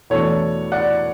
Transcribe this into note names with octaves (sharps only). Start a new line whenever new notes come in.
E2 B2 A3 D4 A4 C#5
D5 F#5